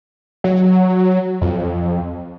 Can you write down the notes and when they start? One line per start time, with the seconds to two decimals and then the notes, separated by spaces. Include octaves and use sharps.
0.44 F#3
1.42 F2